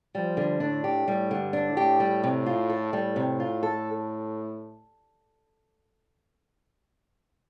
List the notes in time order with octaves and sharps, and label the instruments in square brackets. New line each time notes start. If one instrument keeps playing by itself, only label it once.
[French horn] F3 [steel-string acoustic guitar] G3
[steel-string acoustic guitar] D3
[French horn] A2 [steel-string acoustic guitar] D4
[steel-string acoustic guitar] G4
[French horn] A2 [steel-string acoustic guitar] G3
[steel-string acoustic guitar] D3
[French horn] G2
[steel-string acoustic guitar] D4
[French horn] A2
[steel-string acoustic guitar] G4
G3
C3
F4
A4
[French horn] A2 [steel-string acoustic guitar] G3
[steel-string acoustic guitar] C3
F4
A4